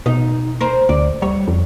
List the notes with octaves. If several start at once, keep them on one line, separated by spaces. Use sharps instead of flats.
B2 D#4
A#4 C5
D2 D5
G3 C#5
F2